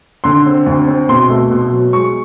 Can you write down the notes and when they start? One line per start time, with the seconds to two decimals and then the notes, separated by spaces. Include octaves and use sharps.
0.24 D3 C6
0.46 C4
0.66 D2
0.88 C4
1.09 B2 C6
1.30 A3
1.51 B2
1.72 F#3
1.93 G#3 C#6